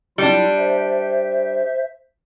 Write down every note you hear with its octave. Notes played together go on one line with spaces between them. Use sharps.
F#3 G3 D4 E4 F4
C5 E5